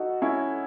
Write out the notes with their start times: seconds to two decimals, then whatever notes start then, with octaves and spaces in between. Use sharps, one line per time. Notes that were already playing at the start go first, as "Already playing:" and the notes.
Already playing: D#4 F#4 A4
0.22 C#4 E4